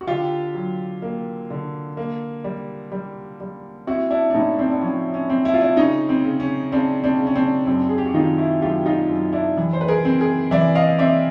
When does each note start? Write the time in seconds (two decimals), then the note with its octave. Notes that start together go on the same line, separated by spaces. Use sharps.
0.01 F#4
0.07 D3 F4 G4
0.54 F#3
1.02 A#3
1.50 D3
1.97 A#3
2.44 G3
2.92 G3
3.40 G3
3.87 C4 E4 F#4
4.10 D4 E4
4.30 D4
4.34 A2 C#4 D#4
4.59 C4 D4
4.71 D4
4.82 F3 C#4
5.14 C#4
5.30 C4
5.45 E4
5.54 F4
5.61 D4 E4
5.77 C#3 C#4 D#4
6.09 C4
6.25 C#3
6.40 C#4
6.72 C#3 C4 D4
7.04 C4 D4
7.19 C#3
7.27 C#4
7.35 C4 D4
7.66 F#2 C4 D4
7.89 G#4
7.98 G4
8.06 F#4
8.14 D#3 D#4 F4
8.38 E4 F#4
8.61 F#2 F4 G4
8.86 D#4 F4
9.09 F#2
9.32 D4 E4
9.57 E3
9.73 C5
9.81 B4
9.88 G#4 A#4
10.05 C4
10.20 G#4 A#4
10.51 E3 D5 E5
10.75 D#5 F5
10.99 C4 D5 E5